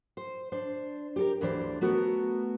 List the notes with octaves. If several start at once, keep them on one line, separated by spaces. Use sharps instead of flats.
C5
D4 C5
G4 A4 A#4
D2 E3 D4 C5
A3 B3 F#4 A#4